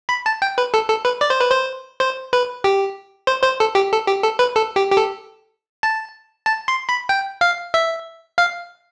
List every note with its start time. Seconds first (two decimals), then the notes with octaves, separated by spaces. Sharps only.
0.09 B5
0.26 A5
0.42 G5
0.58 B4
0.74 A4
0.89 A4
1.05 B4
1.21 D5
1.30 C5
1.40 B4
1.51 C5
2.00 C5
2.33 B4
2.64 G4
3.27 C5
3.43 C5
3.60 A4
3.75 G4
3.92 A4
4.07 G4
4.23 A4
4.39 B4
4.55 A4
4.76 G4
4.91 G4
4.97 A4
5.83 A5
6.46 A5
6.68 C6
6.89 B5
7.09 G5
7.41 F5
7.74 E5
8.38 F5